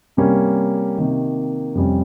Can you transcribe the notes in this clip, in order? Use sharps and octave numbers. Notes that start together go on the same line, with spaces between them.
C3 G3 A#3 C#4
C3 D#3 A#3
F2 C3 G3 C#4